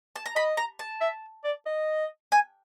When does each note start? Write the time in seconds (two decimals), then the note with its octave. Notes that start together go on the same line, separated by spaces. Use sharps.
0.16 A5
0.26 A#5
0.35 D#5 B5
0.57 A#5
0.79 A5
1.01 E5
1.44 D5
1.66 D#5
2.32 G#5